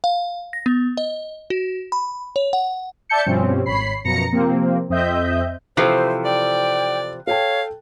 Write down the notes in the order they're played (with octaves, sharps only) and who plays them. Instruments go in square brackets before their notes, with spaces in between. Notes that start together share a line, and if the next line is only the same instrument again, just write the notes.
[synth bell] F5
A#6
B3
D#5
F#4
B5
C#5
F#5
[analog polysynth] D5 E5 A5 G6 C#7
G2 B2 F3 G3 C4 C#4
G#1 C#5 B5 C7
F#2 B2 F3 A#5 A#6 C#7
C3 F3 A#3 C4
F2 C4 D#5 E5 G6
[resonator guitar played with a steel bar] C3 E3 F3 [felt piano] A4 F#6 [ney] C5
[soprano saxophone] D5 [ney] G5
[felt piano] A4 G5 A5 [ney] C#5 [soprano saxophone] F5